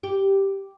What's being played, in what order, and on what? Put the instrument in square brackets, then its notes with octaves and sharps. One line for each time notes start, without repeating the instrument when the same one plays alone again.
[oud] G4